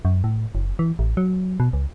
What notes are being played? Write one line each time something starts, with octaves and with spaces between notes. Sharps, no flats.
F#2
A2
F#1
E3
A1
F#3
B2
C#2